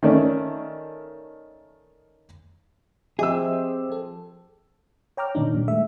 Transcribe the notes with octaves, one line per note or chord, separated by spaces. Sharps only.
D#3 A3 C#4 D5
F3 C4 G4 G#4 D#5 E5 E6
F3 A4
C#5 G5 A#5 D6 F6
A#2 D#3 D4 D#4
A#2 G3
G#3 A3 E5